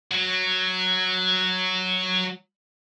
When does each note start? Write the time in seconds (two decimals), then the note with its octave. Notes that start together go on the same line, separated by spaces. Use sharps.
0.12 F#3 F#4